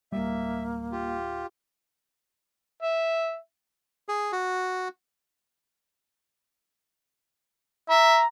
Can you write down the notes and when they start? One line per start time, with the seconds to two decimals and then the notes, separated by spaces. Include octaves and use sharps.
0.12 D1 G1 G3 A#3 E5
0.92 F4 G4
2.82 E5
4.08 G#4
4.32 F#4
7.90 E5 A#5